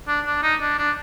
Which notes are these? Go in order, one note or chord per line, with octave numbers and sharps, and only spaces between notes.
D4
D4
D#4
D4
D4